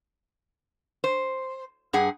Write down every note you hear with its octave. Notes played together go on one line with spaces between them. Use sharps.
C5
G2 G#4 F#5